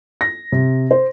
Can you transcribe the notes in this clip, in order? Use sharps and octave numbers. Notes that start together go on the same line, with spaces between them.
A#6
C3
C5